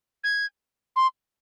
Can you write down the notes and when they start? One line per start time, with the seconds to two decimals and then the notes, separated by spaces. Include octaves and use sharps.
0.24 G#6
0.96 C6